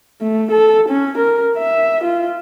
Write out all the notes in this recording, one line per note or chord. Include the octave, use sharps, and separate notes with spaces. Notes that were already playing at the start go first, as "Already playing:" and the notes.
A3
A4
C#4
A#4
E5
F4